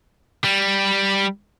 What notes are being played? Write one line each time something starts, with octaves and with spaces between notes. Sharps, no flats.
G3